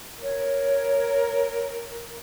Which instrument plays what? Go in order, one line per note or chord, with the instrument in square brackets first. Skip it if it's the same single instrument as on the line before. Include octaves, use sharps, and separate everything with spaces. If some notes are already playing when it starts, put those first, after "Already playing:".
[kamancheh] A#4 [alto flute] C#5